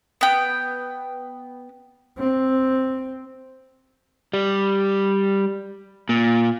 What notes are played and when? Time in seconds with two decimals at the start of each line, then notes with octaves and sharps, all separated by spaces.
0.21 B3 G5
2.18 C4
4.33 G3
6.09 A#2